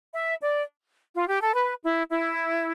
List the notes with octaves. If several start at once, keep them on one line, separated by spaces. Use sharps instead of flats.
E5
D5
F4
G4
A4
B4
E4
E4